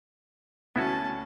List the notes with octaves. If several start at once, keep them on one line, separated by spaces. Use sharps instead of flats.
D2 B3 C#4 E4 F#4 A5